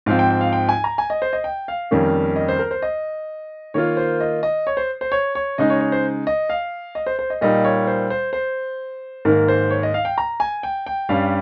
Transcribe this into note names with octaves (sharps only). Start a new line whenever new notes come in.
G#2 F3 C4 F5
G5
G5
F5
G5
G#5
A#5
G#5
D#5
C5
D#5
G5
F5
F2 D#3 G3 A#3 C#4
D#5
C5
A#4
C5
D#5
D#3 A#3 F4 C#5
C5
D#5
D#5
C#5
C5
C5
C#5
C#5
C#3 G#3 D#4 D#5
C#5
C#5
C5
D#5
F5
D#5
C5
C5
D#5
A#2 G3 A#3 D#4 D#5
C#5
C5
C5
C5
G#2 D#3 A#3 A#4
C5
C#5
D#5
F5
G5
A#5
G#5
G5
G5
G2 G3 C#4 F5